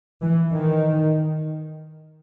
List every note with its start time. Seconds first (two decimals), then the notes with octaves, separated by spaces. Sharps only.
0.21 E3
0.52 D#3